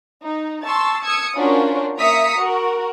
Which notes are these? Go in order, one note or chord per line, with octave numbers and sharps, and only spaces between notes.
D#4
A5 C6 C#6 E6 A6
D#6 E6 G#6 C#7
C#4 D4 F4 F#4 A#4 C5
A#3 E5 A#5 D#6 B6 C#7
F#4 A#4